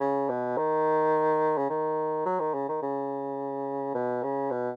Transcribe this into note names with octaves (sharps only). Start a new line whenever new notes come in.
C#3
B2
D#3
C#3
D#3
F#3
D#3
C#3
D#3
C#3
B2
C#3
B2